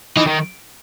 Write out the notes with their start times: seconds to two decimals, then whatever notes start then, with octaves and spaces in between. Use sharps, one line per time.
0.17 E3 D#4
0.27 D#3